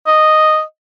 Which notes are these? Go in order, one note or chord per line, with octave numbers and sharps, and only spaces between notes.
D#5